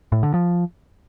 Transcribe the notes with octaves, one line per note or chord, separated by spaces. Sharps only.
A2
D3
F3